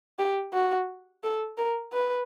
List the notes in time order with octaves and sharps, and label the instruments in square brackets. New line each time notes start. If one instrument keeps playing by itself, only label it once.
[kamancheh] G4
F#4
A4
A#4
B4